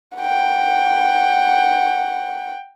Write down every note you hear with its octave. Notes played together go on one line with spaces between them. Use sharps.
F#5 G5